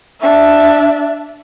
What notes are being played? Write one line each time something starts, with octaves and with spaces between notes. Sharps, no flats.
D4 E5